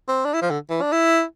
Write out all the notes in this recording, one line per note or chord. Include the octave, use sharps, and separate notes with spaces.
C4
D4
E4
F3
D3
E3
D4
E4